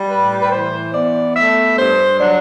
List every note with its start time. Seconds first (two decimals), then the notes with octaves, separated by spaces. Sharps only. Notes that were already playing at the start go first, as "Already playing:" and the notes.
Already playing: G3
0.10 A2 B4
0.41 B4
0.52 E3 C5
0.94 B3 D5
1.36 A3 E5
1.78 G2 C5
2.20 F#3 D4